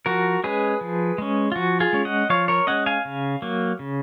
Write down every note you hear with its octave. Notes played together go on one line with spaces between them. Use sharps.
F3 F#4 A#4
G#3 C#4 G#4 B4
F3
G#3 C#4
F4
F3 F#4
F4 G#4
G#3 C#4
D#5 F#5
F3 C#5 F5
A#4 C#5
G#3 C#4 D#5 F#5
F5 G#5
C#3
F#3 A#3
C#3